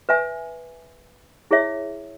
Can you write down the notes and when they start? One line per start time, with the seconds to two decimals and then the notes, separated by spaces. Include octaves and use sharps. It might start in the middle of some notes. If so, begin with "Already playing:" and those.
0.09 B4 E5 G#5
1.51 E4 G#4 C#5 E5